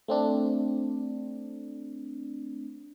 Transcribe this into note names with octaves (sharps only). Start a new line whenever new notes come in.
A3 C4 D4